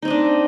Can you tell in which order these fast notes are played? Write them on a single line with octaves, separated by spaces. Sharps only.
D#4 C4 D#5 D4